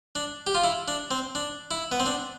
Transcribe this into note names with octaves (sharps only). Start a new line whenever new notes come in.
D4
G4
F4
E4
D4
C4
D4
E4
B3
C4
D4